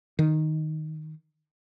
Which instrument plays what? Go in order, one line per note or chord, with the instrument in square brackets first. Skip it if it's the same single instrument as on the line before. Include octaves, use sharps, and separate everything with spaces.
[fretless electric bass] D#3